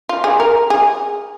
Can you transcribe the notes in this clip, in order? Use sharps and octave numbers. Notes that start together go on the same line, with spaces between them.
F4
G#4
A#4
G#4